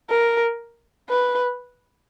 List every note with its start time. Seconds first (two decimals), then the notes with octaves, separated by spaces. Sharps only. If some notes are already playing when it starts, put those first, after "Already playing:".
0.10 A#4
1.09 B4